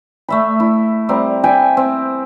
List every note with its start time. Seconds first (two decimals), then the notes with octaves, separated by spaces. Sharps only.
0.28 A3 E5 B5
0.60 E4
1.09 G3 C4 A#4
1.44 E5 G5 G#5
1.77 C4